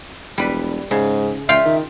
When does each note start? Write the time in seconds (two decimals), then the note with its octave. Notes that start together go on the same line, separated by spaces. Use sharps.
0.38 E1 G3 B4
0.91 G#2 C#3
1.49 C#2 F4 E5 F5 G5
1.65 D#3